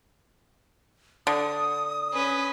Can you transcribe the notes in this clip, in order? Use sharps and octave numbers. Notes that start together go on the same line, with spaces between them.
D3 D#6
C#4 B4